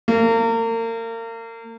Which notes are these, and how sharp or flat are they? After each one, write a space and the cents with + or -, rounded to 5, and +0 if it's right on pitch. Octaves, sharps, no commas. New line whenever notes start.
A#3 -35